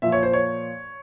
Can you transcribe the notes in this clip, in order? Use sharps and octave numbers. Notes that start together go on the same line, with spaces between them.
A#2 F3 E5
C#5
C5
C#5